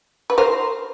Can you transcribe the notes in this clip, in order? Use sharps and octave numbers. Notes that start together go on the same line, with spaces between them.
B4
A#4 C5